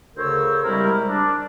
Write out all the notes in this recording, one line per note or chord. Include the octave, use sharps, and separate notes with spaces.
D2 C#3 A#4 C5 C#5 E6
C3 G3 G#3 E4 A#4
D4